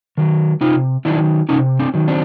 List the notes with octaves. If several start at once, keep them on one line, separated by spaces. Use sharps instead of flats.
D#3 F#3
C3 D#4 F4
D#3 F#3 D4 E4
C3 C#4 D#4
C4 D4
D#3 F#3
C4 D4